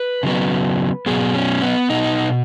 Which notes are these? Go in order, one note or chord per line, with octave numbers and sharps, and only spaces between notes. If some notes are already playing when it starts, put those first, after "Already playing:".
Already playing: B4
C#3 F#3 B3
B2 F#3 B3 G#4
C#4
B3
B2 B3 D#4